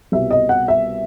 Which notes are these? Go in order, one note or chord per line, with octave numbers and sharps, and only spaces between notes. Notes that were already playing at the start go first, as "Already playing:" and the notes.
C2 B2 G3 B3 E5
D#5
F#5
E5